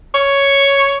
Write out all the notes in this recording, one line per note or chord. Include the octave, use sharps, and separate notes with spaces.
C#5